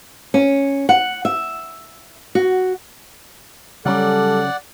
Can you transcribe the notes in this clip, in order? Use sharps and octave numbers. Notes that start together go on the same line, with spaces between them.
C#4
F#5
E5
F#4
C#3 F#3 G3 C#4 A4 D5 F#5